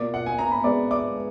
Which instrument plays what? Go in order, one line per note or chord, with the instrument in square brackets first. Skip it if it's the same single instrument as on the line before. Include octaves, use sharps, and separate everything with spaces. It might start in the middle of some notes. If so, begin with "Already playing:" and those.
Already playing: [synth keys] B2 A#3 F4 [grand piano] D5 D6
[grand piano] F#5
G#5
A#5
B5
[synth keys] B2 G#3 B3 [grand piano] D5 D6
[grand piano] D5 D6